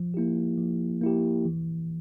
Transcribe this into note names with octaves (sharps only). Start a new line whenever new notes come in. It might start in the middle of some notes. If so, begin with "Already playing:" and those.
Already playing: F3
A#3 E4 G4
F3
A#3 E4 G4
E3